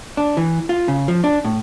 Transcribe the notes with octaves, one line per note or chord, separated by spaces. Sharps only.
D4
E3
F4
C#3
F3
D4
A2